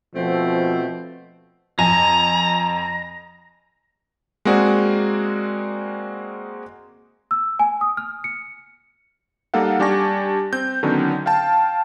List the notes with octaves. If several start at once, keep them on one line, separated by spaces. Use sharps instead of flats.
B2 F3 A3 C4
F2 G#5 A#5 A#6
G#3 A#3 C4 F#4 G#4 D5
E6
G#5
D#6
F6
C#7
G3 A#3 D#4 A4 F5 F#5
G3 D4 G4 G#5 C#6 A#6
C4 G6
D3 D#3 F#3 B3 C#4
F5 G5 A5